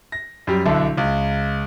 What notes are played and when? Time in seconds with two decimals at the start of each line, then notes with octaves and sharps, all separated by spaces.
0.12 A#6
0.47 F#2 G3
0.66 B1 D3 D4 E4 A4
0.97 C#2